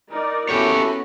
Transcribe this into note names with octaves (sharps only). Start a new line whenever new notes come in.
D#4 A#4 D5
B3 C#4 E4 F#4 G4 A4 C#5